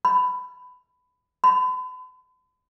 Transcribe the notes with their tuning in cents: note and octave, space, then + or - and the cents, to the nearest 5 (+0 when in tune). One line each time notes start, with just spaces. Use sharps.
B5 +15
B5 +45